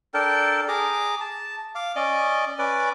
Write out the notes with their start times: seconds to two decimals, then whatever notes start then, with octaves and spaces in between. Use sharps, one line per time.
0.14 D4 A4 A#4 G5
0.68 G#4 A#5 D6
1.21 A5
1.75 F5 D6
1.96 C#4 D5 D#5
2.59 C#4 B4 D5